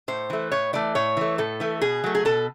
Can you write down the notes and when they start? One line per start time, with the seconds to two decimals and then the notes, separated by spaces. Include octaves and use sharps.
0.08 A2 C5
0.30 E3 A3
0.52 A2 C#5
0.73 E3 A3 D5
0.95 A2 C#5
1.17 E3 A3
1.38 A2 A4
1.60 E3 A3
1.81 B2 G#4
2.04 F#3 A3
2.15 G#4
2.25 B2 A4